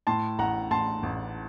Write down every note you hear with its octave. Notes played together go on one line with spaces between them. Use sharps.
A2 A5 C6
A1 F#5 A#5
A1 A5 C6
A1